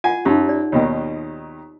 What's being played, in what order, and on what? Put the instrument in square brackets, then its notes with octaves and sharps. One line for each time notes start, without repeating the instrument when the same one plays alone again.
[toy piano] F4 F#5 [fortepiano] G#5
[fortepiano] F#2 [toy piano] D#4 G4
[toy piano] D5
[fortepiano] D#2 B2 D#3